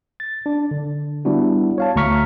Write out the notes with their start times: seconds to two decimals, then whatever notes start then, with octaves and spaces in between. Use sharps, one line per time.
0.20 A6
0.46 D4
0.71 D3
1.25 G3 B3 D4 E4 F#4
1.78 C#5 F5 A5
1.96 D2 A3 A#5 C#6 F6 B6